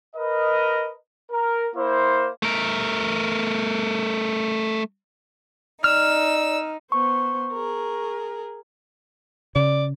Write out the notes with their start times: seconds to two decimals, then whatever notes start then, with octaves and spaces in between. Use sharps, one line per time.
0.16 A#4 B4 D#5
1.32 A#4
1.76 A#3 E4 C5
2.42 A3 A#4
5.84 D#4 D5 E6 F6
6.92 B3 C5 C#6
7.53 G#4 A#4
9.56 C#3 D5